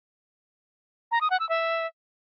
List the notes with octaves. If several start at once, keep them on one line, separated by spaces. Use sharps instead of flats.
A#5
D#6
F#5
E6
E5